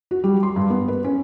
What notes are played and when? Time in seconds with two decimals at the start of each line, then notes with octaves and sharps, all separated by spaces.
0.11 F#4
0.24 G3
0.43 C6
0.56 G2
0.70 B3
0.88 B4
1.04 C#4